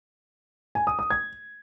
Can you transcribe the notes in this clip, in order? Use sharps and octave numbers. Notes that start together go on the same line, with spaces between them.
G#5
D#6
D#6
G#6